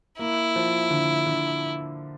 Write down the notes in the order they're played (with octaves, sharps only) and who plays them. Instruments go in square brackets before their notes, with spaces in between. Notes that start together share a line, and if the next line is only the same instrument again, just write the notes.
[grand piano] A#3 [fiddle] E4
[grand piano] F3
D3
D3